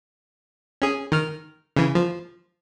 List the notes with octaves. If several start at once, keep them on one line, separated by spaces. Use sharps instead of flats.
C#4 G#4
D#3 F6
C#3 E3
F3